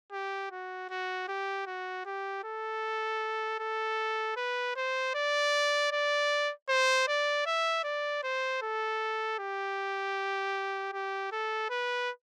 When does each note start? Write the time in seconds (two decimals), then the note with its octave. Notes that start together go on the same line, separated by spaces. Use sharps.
0.12 G4
0.51 F#4
0.90 F#4
1.28 G4
1.66 F#4
2.05 G4
2.44 A4
3.59 A4
4.36 B4
4.76 C5
5.15 D5
5.92 D5
6.69 C5
7.08 D5
7.46 E5
7.84 D5
8.23 C5
8.62 A4
9.39 G4
10.93 G4
11.32 A4
11.70 B4